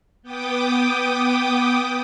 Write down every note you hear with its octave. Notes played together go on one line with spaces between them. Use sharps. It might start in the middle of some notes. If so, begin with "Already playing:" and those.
B3 G5 D6 D#6